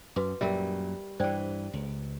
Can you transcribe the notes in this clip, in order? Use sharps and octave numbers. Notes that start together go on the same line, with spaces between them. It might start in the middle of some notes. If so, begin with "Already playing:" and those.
F#2 F#4 B4 D6
F#2 A#2 F#3 G3 A#4 E5
G2 E3 C5 D5 G5
C#2